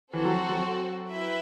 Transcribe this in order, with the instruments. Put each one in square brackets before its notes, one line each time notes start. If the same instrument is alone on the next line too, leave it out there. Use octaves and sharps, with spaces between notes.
[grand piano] E3 [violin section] C4 F#4 A4
[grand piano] F#3
F#3
[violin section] E4 B4 E5 G5